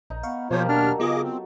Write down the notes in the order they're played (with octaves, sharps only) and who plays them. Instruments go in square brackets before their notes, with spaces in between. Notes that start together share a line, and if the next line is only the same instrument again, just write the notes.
[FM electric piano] A#1 [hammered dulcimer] D#4
[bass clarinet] B3 [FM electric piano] F5 C#6
[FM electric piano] B2 [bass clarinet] F3 [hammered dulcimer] A#3 G4 [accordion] F4 C5 C#5
[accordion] D#2 F6 [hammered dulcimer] F#3 A4 [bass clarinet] D4
[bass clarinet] C#3 [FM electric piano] B3 F4 [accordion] G#4 D#5 D6
[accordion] C4